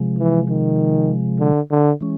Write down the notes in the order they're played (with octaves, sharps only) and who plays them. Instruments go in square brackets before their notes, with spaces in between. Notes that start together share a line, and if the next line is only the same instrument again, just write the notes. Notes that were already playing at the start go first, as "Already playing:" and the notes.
Already playing: [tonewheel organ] C3 F3 G#3
[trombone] E3
D#3
D3
D3
[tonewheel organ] E3 G#3 C#4